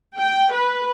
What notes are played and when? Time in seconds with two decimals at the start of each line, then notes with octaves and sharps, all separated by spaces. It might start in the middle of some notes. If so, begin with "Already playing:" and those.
0.17 G5
0.54 B4